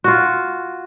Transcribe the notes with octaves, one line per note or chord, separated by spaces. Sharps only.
F4 F#4